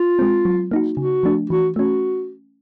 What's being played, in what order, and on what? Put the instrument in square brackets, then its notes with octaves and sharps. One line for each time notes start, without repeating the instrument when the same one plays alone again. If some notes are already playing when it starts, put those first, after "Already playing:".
Already playing: [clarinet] F4
[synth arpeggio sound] G#3 C4
F#3
A#3 D#4 F#4
[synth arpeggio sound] C#3 [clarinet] F#4
[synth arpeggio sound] F3 A3 D4
[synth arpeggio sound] E3 [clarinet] F#4
[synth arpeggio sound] A3 C#4 [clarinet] F#4